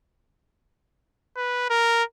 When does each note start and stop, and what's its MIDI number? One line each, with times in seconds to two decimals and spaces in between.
1.37 1.69 71
1.70 2.04 70